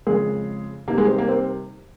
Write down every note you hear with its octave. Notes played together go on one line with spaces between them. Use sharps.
F2 C#3 G#3 G#4
C3 D#3 G3 A#3 A#4
G#3 G#4
C4
A#3
C4